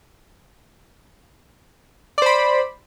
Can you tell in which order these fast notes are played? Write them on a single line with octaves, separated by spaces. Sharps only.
D5 C5 B5